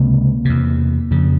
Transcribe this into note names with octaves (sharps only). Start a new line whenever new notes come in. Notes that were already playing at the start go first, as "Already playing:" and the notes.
Already playing: C#2 C3 A#3
E2 C3
F2 C#3